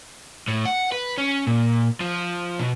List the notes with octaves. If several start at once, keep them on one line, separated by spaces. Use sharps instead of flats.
A2
F#5
B4
C#4
A#2
F3
B2